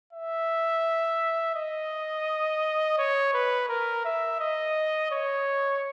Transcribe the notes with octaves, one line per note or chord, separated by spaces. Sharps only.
E5
D#5
C#5
B4
A#4
E5
D#5
C#5